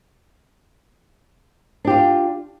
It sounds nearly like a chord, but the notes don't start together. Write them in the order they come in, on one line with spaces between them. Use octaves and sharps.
D4 G4 F4